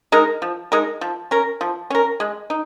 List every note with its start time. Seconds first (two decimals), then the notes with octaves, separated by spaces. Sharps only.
0.12 G#3 D#4 A#4
0.42 F3
0.72 G#3 D#4 A#4
1.01 F3
1.31 C#4 A#4
1.61 F3
1.90 C#4 A#4
2.20 G#3
2.50 D#4